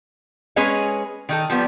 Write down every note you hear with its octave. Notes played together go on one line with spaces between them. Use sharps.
G#3 C#4 G#4 B4 C#5 D#5
D#3 D#4 A4
F3 G3 B3